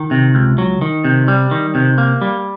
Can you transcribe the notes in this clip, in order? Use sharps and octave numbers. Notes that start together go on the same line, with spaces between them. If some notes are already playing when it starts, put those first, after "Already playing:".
Already playing: D#3
C3
C#2
F#3
D#3
C3
G3
D#3
C3
A#3
G3